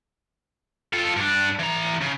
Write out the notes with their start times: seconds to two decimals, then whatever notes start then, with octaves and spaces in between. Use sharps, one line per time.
0.93 F4 A4
1.16 G2 D4
1.59 E3 A#5
2.01 C#3